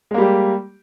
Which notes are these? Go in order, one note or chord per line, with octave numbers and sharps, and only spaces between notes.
G3 G#3 A#3 G4